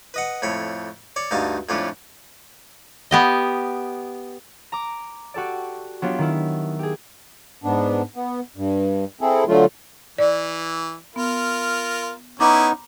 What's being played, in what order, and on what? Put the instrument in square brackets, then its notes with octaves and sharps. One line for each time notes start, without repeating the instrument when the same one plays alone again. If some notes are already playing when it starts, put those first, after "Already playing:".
[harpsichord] B4 D#5 F#5
F2 A2 C#5 B5
C#5 D5
D2 G2 D#4 F5 A5
F2 A2 C#4 D4 F4
[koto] B3 G4 D#5
[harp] A#5 D6
F#4 G4 A4 D5
F#3 B3 D4 F4 G4
D#3 E4
G4 G#4
[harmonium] G#2 B3 D4
B3
G2
C4 E4 G#4 A4
D3 F#3 A3 F4
[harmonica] E3 [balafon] D5
[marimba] B3 [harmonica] F4 A#4
[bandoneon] B3 D#4 [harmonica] C#4 E4 [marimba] A#5 B5 D6